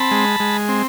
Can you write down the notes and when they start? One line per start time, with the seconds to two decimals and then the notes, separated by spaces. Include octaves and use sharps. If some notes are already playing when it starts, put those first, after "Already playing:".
Already playing: C4 A5 B5
0.11 G#3
0.40 G#3
0.68 C4